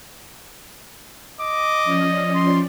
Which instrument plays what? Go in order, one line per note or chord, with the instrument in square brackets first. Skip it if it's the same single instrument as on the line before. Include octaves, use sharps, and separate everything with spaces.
[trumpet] D#5 [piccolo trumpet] D6
[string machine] F3 C#4 D5
[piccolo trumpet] C6